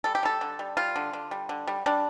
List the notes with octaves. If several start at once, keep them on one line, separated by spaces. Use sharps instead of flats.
G3 A4
G4
G3 A4
D3
G3
G3 F4
D3
D3
G3
D3
G3
G3 D4